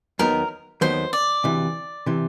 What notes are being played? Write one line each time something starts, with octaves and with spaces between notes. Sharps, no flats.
D#2 D#3 F#3 B3 A#4
D#2 D#3 F#3 B3 C5
D5
D2 C3 E3
C3 E3